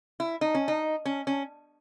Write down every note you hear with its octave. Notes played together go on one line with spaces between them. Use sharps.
E4
D#4
C#4
D#4
C#4
C#4